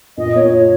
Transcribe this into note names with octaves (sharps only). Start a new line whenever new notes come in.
A#2 D#5
A#3 C#5
F4 C#5